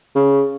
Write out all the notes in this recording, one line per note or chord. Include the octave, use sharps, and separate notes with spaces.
C#3